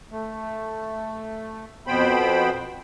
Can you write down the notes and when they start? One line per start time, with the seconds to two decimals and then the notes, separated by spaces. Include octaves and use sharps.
0.11 A3
1.87 F2 B2 B3 C5 G5 B5